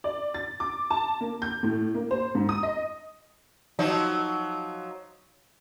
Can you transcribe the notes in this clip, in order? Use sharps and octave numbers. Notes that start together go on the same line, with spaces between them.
D5
A6
D6
A5
A#3
G6
A2
A#3
C5
G#2
D#6
D#5
F3 F#3 D#4